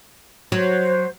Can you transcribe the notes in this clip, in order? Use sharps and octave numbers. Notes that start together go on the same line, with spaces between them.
F#3 C5